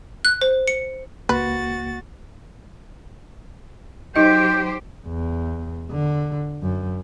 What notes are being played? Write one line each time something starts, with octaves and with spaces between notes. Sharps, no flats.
F#6
C5
C#7
C#2 A#3 F#4 B4 A6
F#3 D#4 G4 C5 D#5 G6
E2
D3
F#2